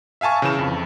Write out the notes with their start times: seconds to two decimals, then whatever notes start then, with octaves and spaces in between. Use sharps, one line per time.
0.21 E5 F5 G#5 A5 C#6
0.42 C#3 E3 E7
0.59 F2